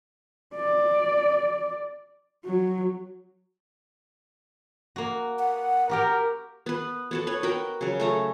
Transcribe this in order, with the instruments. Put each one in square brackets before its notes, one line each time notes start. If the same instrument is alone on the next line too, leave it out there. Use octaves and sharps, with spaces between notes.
[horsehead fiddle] D5
F#3
[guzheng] A#3 F#4
[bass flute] F#5
[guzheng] F#4 G4 G5 [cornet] A#4
[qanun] B3 B4
B3 F#4 A4
B4 C#5
F#4 A#4 B4 G5
C#3 F#3
A3 A4 A#5